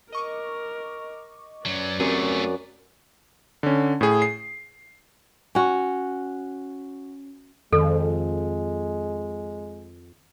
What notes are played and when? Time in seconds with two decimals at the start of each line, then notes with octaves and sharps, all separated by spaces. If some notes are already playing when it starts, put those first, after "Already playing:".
0.12 A#4 D#5 C#6 D6
1.66 F#2 F#3 B4 D5
2.00 F#2 A3 C4 G4 G#4
3.63 D3 C#4
4.01 A2 G#4
4.22 C7
5.55 C#4 F#4
7.73 F2 D#3 G#3 A4